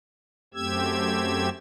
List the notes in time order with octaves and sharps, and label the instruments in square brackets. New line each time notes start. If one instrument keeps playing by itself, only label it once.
[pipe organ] F#2 A3 C4 G4 E6 G#6